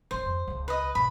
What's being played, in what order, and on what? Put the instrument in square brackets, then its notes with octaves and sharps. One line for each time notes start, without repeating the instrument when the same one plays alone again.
[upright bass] D#3 C#4 [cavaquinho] C5
[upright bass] F2
C#2 C#3
[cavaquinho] B4 D#5
[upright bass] B2 D3 [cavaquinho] B5